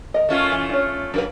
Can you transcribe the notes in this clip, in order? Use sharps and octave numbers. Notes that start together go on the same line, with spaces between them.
A#4 D#5
A3 C#4 F4
E3
D4 C#5
F#3 A#3 D4 A#4 B4